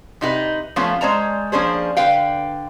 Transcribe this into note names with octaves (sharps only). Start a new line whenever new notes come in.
C3 D#4 F#4 B4
F3 A3 B3 C#4 F4
G#3 C#4 C5 D5 A5 A#5
F3 A#3 C#4 D4 G#4 C5
D3 B4 F5 G5